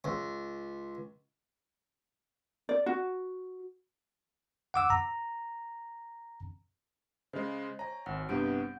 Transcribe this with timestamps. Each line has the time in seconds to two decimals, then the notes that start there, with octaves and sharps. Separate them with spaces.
0.04 C#2
2.69 D5
2.86 F#4
4.74 F#5 D6 E6
4.90 A#5
7.33 C#3 G#3 C5 D#5
7.79 C#5 G#5 A#5
8.06 G#1 F#5
8.29 G2 C3 B3 F#5 G6 D7